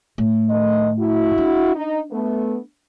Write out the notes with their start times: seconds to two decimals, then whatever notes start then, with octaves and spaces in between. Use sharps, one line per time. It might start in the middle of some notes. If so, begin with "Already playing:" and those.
0.18 A2
0.49 D#3 A3 D#5
0.98 E4 F#4
1.38 D4
1.75 D#4
2.11 A3 B3